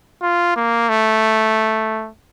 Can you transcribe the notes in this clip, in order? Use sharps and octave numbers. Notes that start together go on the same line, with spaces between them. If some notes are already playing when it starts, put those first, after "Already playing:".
F4
A#3
A3